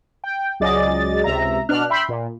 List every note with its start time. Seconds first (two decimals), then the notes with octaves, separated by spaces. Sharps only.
0.24 G5
0.60 C#2 F#3 G#4 D5 D#5 A6
1.24 C#2 C3 E5 A#5
1.69 B2 D4 F6 F#6
1.90 E5 G5 B5 C6
2.09 A#2